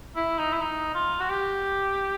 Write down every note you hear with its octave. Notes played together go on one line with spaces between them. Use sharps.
E4
D#4
E4
D#4
F4
F#4
G4